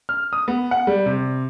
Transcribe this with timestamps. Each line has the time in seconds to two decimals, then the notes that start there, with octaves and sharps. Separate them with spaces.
0.09 F6
0.33 D#6
0.48 B3
0.71 F#5
0.87 G3
1.06 C3